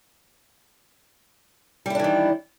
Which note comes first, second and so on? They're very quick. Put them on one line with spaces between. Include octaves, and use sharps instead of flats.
G3 E4 D4 E3 D#3